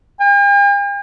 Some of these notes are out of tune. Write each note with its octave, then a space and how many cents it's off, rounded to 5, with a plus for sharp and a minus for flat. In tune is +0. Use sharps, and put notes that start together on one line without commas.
G5 +45